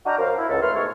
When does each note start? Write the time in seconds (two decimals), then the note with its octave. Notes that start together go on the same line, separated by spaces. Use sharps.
0.06 D4 F#4 D#5 F5 G5 A#5
0.18 F#2 A#4 C5 F5
0.38 E4
0.49 C#2 A4
0.62 F#2 A3 B4 C6 F6
0.75 G#2 B2 A3 C#5